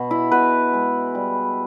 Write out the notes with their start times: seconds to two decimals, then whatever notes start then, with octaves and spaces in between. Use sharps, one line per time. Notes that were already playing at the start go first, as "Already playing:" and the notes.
Already playing: B2
0.11 E4
0.31 B2 B4
0.73 G#3
1.15 G3